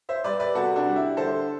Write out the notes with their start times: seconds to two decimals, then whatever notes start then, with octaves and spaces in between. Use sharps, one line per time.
0.09 C5 E5
0.24 G3 B4 D5
0.40 B4 D5
0.55 C3 F#4 A4
0.76 D4 F#4
0.86 G3
0.96 E4
1.17 D3 A4 C5